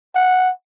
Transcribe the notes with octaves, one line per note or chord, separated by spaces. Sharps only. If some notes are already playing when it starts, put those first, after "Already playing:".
F#5